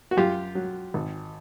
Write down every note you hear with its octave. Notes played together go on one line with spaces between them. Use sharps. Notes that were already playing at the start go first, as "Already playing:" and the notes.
F#4
F#2 F4 G4
F#3
G#1